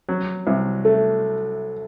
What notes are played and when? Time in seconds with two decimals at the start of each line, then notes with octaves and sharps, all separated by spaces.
0.09 F#3
0.47 C2
0.85 A3